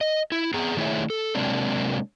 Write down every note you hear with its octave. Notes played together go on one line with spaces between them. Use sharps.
D#5
E4
B3 G#4 A#5
D#3 A3 E4 G#4 C#5 E5
A4
C3 F#3 G#3 A#3 C4 D4